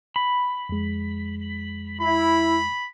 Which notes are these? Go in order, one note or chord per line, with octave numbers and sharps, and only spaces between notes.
B5
F2 G#3
E4 B5